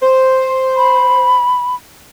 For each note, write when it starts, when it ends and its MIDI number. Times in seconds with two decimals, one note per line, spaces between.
0.03 1.48 72
0.77 1.75 83